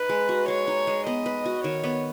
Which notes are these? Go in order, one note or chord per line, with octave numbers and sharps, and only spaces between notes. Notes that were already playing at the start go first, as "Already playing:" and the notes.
Already playing: D#4 B4
G#3
F#4
G#3 C#5
D#4
G#3
B3 D#5
B4
F#4
D#3 C#5
B3